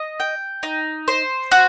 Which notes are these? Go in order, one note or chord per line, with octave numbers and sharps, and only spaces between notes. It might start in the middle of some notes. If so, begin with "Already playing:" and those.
Already playing: D#5
G5
D#4
C5
F#4